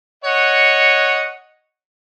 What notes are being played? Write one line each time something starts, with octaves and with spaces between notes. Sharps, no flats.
C#5 D#5 F#5